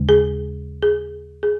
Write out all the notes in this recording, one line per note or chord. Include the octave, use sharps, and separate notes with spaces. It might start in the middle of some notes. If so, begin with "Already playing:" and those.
Already playing: D#2 C#3 G#3
G#4
G#4
G#4